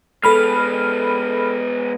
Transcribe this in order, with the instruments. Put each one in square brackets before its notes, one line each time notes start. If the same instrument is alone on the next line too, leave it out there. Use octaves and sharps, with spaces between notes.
[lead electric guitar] G#3 B3 [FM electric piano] A4 B5 F6